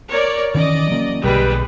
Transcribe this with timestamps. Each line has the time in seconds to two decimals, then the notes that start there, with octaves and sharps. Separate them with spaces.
0.11 A#4 C#5 D5
0.55 D#3 E3 C#4 D5 D#5
0.91 F#3 A#3 C#4
1.24 B1 D3 G3 G#3 B4